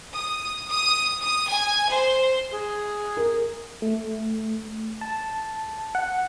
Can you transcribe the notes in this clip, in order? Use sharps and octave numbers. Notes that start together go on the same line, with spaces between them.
D#6
D#6
D#6
G#5
C5
G#4
A#4
A3
A5
F#5